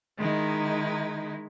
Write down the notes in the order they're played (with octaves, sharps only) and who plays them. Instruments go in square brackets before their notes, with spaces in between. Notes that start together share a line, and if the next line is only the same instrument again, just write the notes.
[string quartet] D#3 G#3 D#4 E4